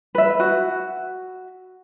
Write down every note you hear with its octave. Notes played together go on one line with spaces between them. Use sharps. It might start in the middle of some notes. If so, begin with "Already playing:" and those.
B4 E5
F#4